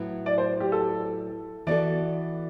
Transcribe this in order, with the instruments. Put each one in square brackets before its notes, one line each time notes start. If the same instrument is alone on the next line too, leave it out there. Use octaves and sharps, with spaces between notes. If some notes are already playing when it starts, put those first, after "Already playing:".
Already playing: [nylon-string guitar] A2 F#3 B3 E4
[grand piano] D5
C5
G4
A4
[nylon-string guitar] E3 B3 F#4 A4 [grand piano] D5